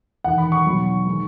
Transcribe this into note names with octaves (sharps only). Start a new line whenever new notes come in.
E1 E2 D#3 F#5
B5
C#6
B1 B2 F#3
D#3 G#3